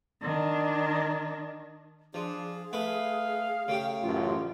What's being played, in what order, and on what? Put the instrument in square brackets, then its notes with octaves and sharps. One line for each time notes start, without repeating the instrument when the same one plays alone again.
[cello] D#3 D4
[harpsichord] F3 [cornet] D4 [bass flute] G#4
[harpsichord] A3 B4 [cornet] F5
[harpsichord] C#3 G4 [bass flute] A3
[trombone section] A1 F#2 F4